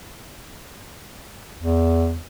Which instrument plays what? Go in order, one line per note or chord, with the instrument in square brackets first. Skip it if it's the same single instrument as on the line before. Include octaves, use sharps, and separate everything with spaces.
[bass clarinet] E2